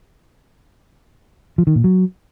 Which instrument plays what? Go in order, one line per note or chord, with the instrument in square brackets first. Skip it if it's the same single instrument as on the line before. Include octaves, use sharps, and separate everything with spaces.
[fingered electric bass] F3
D#3
A#2
F#3